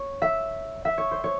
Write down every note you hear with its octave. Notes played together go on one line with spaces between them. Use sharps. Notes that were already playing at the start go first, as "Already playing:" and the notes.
Already playing: C#5
E5
E5
C#5
C5
C#5